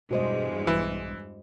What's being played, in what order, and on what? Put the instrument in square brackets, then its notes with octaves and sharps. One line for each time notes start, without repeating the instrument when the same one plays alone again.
[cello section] E2 G2 G#3 [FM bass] B2 [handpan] F#4 C5 D#5
[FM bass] A#1 [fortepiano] E3